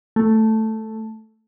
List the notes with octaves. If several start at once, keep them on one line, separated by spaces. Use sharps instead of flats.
A3